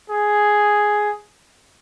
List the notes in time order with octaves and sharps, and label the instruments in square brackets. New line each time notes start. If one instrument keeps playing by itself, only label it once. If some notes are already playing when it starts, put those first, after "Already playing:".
[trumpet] G#4